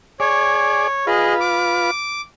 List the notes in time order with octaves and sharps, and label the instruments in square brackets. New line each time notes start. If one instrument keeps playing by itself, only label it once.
[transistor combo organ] G#4 D5 [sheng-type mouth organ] C#5
[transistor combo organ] F4 B4 [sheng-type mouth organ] G#4 D#5
[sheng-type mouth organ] D6